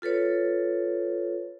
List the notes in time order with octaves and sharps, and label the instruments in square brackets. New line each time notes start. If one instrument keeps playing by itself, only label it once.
[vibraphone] F4 A4 B4 C#5